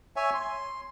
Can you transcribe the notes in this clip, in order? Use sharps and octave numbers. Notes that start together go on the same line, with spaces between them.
C#5 E5 G#5
C6